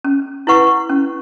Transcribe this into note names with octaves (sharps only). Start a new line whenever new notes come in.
C#4
E4 B4 F#5 C#6
C#4